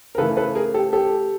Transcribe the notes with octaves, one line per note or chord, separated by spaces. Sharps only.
A#4
C#3 E3 A3 A4 B4
A4 B4
G#4 A#4
G4 A4
G4 A4